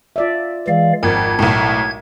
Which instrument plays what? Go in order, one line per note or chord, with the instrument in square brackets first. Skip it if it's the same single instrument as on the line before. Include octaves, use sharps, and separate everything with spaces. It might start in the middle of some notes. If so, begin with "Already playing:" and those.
[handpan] F4 D5 E5
[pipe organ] E3 D5 F5 [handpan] G#3
[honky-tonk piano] G#1 F2 [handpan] A#4 [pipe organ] G#6
[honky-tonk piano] B1 A2